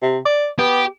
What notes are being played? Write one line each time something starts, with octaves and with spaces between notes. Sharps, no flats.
C3
D5
B3 G4